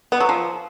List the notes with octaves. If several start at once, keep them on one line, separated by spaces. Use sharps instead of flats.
B3
F#3
F3